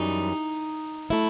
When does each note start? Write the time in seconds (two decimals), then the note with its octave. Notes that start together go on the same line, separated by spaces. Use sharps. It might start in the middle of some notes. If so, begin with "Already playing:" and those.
Already playing: F#2 E3 G3 D#4
1.10 F#3 A3 E4